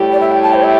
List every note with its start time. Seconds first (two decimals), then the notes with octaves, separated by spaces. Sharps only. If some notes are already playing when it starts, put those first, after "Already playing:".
Already playing: A2 G3 E4 G4
0.12 D5
0.20 E5
0.32 G5
0.43 A5
0.54 C5
0.65 E5